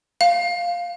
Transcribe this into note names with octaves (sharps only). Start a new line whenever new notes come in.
F5